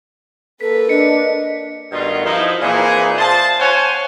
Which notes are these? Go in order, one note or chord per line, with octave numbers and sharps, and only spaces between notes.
A#3 A4 B4 B6
D4 D#5 C#7
G2 B2 D#3 A3 F4 F#4
F3 D#4 E4
A#2 E3 C4 D#4 E4 G#4
F4 G#4 C5 A5
C5 C#5 F5 F#5 G#5